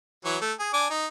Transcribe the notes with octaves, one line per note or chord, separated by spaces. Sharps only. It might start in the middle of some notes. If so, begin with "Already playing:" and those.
E3 F#3 C#5
A3
G#4
D4 G#5 D6
D#4